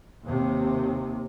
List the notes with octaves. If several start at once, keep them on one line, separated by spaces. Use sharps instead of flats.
D#2 C3